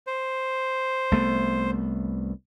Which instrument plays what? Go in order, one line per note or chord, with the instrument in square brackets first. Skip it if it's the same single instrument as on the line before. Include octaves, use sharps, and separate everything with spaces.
[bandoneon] C5
[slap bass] C2 A3 B3